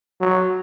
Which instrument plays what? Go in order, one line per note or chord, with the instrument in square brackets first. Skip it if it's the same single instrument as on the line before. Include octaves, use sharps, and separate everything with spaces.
[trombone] F#3